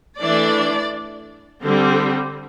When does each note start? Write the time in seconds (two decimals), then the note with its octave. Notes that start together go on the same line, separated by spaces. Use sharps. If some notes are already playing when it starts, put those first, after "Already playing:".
0.20 E3 A3 D4 D5
1.63 D3 G3 C4